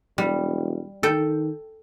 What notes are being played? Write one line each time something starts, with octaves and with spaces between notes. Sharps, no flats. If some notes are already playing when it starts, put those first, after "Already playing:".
E1 G3
D#3 A4 G5